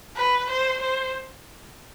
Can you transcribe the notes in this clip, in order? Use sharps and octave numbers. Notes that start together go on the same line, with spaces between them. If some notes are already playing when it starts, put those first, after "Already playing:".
B4
C5
C5